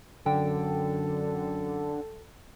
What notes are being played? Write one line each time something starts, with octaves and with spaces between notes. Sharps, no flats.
F#2 D3 A4 G5